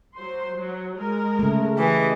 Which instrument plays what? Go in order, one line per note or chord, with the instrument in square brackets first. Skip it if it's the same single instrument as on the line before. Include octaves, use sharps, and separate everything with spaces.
[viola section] F#3 C5 C6
F#3
G#3 A#4
[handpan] C#3 A3
[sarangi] E3 [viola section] G4 D#5